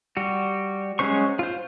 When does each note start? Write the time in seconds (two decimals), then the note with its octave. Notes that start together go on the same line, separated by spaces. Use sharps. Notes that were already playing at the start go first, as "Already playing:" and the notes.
0.17 G3 F#4
0.99 F#3 G#3 C#4 C5 C#6
1.39 F4 C5